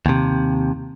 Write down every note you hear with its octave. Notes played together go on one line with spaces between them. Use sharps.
D#2 C3